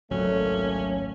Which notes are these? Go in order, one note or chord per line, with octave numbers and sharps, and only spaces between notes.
G#1 C#2 A#2 F#3 A3 C#4